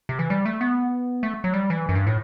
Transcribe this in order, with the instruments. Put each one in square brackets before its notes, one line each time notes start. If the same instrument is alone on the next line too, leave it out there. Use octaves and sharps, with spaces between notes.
[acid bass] C3
E3
G3
A3
B3
A3
F#3
G3
E3
F#2
G2
A2